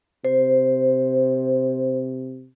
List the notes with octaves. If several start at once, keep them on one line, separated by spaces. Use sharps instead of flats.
C3 C5